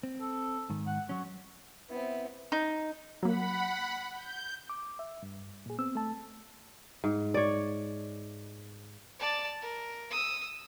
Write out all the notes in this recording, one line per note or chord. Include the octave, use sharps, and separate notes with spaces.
C4
A4
G#2 D#3
F#5
F#3 C#4 F#4
B3 C4 E4
D#4
F#3 A#3 F#5 B5
G6
D6
E5
G2
A#2 G#4
B3 C4 E6
A3 A5
G#2
C#5 D5
D5 A5
A#4
D#6 E6